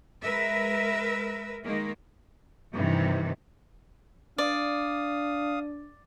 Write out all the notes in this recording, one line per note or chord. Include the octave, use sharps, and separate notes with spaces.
G#3 A#4 B4 E5
D#3 G#3 A#3
G2 C3 D#3 E3
D4 D5 F5 D#6